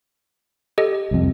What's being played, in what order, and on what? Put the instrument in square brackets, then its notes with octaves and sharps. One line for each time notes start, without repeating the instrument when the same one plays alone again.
[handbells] G4 A4 D#5
[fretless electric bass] C2 F2